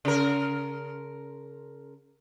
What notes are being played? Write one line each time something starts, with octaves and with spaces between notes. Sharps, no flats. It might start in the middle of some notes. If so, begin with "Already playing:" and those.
C#3 A#4